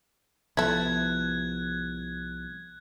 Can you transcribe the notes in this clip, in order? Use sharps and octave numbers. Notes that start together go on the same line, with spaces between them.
C2 F3 B3 E4 A4 F#6 G#6